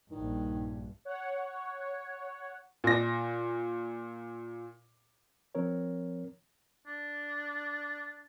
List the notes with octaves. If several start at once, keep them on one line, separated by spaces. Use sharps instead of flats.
A#1 G2 D#3
C#5 F#5
A#2 A#6
F3 C4 A#4 C#5
D4